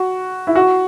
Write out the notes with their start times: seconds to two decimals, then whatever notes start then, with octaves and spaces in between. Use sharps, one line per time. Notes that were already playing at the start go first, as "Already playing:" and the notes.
Already playing: F#4
0.47 E4
0.55 F#4